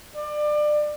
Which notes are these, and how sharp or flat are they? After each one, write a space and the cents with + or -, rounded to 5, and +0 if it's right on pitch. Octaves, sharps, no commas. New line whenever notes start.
D5 +25